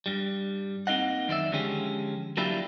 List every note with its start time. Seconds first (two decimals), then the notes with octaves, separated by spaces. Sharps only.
0.06 G2 G3
0.87 A#3 C4 D#4 D#5 F#5
1.28 F#2 D#3 E4 D5 E5
1.52 D3 F3 G#3 C#4 G4
2.37 F#3 A#3 D4 E4 F4 G4